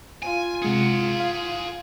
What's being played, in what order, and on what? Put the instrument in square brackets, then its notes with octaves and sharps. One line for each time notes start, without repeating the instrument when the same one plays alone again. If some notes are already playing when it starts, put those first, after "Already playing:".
[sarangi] F4 [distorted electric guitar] G#5
[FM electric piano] C3 G#3 C#7 [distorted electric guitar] G#4 F#5
[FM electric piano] F5